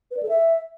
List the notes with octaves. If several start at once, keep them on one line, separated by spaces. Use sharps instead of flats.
B4
D5
A4
E5